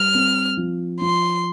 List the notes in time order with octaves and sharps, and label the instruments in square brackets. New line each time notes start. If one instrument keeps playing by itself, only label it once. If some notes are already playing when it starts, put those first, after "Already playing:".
Already playing: [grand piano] G3 [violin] F6
[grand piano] C4
F3
[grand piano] F3 [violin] C6